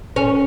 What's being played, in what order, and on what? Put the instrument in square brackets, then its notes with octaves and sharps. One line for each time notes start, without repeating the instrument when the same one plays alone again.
[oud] C#4